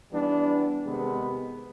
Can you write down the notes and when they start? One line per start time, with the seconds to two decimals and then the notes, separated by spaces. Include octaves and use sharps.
0.11 E3 G3 B3 D4
0.83 C3 D#3 G#3 B3